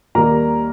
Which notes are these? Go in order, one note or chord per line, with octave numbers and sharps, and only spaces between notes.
D#2 D#3 G3 A#3 A#4 A#5